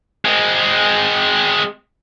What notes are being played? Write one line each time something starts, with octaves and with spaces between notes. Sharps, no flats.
G#3 C4